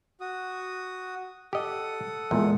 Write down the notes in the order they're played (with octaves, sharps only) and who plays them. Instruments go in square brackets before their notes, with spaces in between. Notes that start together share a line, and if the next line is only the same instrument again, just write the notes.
[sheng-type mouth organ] F#4 D#6
[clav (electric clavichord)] G4 D#5 [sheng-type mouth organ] A4 F#5 D#6
[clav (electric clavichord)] E2 A#2 [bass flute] G#3